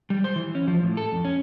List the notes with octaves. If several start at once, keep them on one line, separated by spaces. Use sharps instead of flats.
G3
C5
E3
C#4
F3
A2
A4
F2
C#4